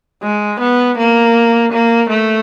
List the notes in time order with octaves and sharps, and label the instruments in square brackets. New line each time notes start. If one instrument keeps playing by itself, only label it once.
[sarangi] G#3
B3
A#3
A#3
A3